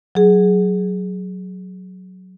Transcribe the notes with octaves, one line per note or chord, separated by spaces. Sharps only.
F#3 G#4